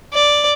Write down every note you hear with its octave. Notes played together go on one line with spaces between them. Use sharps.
D5